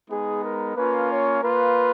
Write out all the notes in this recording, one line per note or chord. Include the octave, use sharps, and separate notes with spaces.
G#3 B3 D#4 G#4
A#4
A#3 C#4 F4 B4
C#5
A#3 F4 B4